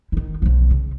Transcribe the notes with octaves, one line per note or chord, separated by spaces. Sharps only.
D#3 E4
B1 F3
C#3